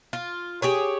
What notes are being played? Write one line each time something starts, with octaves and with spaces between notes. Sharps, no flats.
F4
G4 G#4 C#5